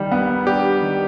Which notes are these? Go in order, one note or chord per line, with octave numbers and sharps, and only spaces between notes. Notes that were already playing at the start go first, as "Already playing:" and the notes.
Already playing: D#3 G3
B3
D4 G4
D#3